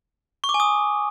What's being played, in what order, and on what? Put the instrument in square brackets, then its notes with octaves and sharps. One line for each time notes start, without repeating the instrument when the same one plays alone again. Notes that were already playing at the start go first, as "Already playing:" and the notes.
[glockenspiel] C#6
D6
G#5
D#6